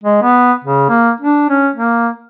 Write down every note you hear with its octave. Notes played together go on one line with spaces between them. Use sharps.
G#3
B3
C#3
A#3
D4
C#4
A#3